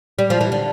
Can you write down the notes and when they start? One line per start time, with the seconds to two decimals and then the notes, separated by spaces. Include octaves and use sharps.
0.19 G3
0.30 F3
0.41 E3
0.52 D3